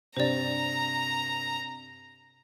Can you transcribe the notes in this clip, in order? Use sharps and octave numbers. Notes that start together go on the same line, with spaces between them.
G2 C3 C5 D5 A#5